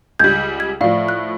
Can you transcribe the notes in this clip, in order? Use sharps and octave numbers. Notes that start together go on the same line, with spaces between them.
C#2 G3 G6 G#6
G#6
A2 F3 D5 F5
F#6